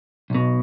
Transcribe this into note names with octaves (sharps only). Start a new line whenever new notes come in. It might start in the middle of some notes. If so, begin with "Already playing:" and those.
B1 B2